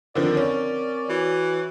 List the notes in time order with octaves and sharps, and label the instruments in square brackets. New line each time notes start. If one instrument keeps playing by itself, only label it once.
[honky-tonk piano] D3 D#3 F3 [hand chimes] C4 A#4 [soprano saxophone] D5
[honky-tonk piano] C#4
[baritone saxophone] E3 [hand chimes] F#4